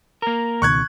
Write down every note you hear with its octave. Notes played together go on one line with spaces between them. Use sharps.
A#3 A#4
C#2 B2 D#3 C#6 F#6 G#6